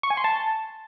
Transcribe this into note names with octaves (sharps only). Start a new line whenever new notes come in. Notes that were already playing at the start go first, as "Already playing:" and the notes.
C#6
G#5
C6
A5